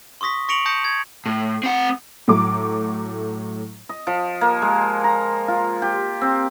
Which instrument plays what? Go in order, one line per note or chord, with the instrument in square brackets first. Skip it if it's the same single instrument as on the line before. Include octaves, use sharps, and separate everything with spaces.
[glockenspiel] C6 C#6 D#6 A#6 B6
C#6 A#6 C#7 D7 F7 F#7
A5 D#6 G6 A#6 C#7
G#6
[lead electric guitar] A2
C4 F#5
[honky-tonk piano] A2 F#3 A3 D6
[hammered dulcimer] D#5
F3
A#3
G#3
A#5
F4
G4
C4